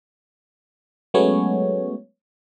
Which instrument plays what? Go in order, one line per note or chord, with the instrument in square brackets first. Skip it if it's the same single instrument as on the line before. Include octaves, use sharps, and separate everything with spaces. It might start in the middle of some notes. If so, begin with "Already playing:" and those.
[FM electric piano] F#3 G#3 A3 B3 C#4 C#5